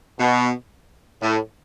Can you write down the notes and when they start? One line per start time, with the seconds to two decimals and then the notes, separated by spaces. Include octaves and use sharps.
0.19 B2
1.21 A2